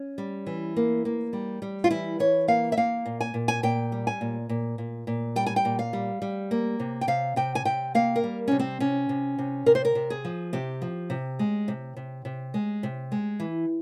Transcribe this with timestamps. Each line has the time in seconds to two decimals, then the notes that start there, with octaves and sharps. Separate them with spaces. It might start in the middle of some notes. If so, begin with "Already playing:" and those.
Already playing: C#4
0.18 G3
0.47 E3
0.76 A#3
1.05 A#3
1.33 G3
1.62 G3
1.84 F4
1.91 E3 E4
2.19 E3 C#5
2.48 A#3 F5
2.72 E5
2.77 A#3 F5
3.06 A#2
3.21 G#5
3.34 A#2
3.48 G#5
3.63 A#2 G5
3.92 G3
4.07 G#5
4.21 A#2
4.49 A#2
4.78 A#2
5.07 A#2
5.36 G3 G5
5.46 G#5
5.56 G5
5.65 A#2
5.79 F5
5.93 G3
6.22 G3
6.51 A#3
6.80 C3
7.01 G5
7.08 C3 F5
7.36 C3 G5
7.55 G#5
7.65 C3 G5
7.95 A#3 F5
8.16 A#4
8.24 G3
8.48 C3 C#4
8.59 C4
8.80 C3 C#4
9.09 C3
9.39 C3
9.66 C3 A#4
9.75 C5
9.85 A#4
9.95 C3
10.10 G#4
10.25 F3
10.53 C3 G4
10.82 F3
11.10 C3
11.39 G#3
11.68 C3
11.96 C3
12.25 C3
12.54 G#3
12.83 C3
13.12 G#3
13.40 E3